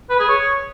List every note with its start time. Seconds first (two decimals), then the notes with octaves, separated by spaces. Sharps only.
0.10 B4
0.19 G#4
0.29 C#5